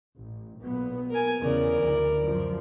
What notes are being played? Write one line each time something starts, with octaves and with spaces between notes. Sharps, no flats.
A1
B1 A#2 B3
A#4 G#5
E2 C#3 A#4 D5
D2 E3
F#2 F3